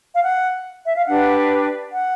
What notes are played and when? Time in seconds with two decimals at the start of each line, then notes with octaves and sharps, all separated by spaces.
0.14 F5
0.23 F#5
0.86 E5
0.97 F5
1.08 D4 G4 B4 F#5
1.92 F#5